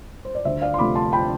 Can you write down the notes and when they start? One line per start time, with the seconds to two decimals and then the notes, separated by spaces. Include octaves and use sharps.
0.25 C5
0.35 D5
0.45 D2 C5 E5
0.62 D5 F5
0.74 C6
0.78 C3 F3 A3 B5 D6
0.95 A5 C6
1.13 G5 B5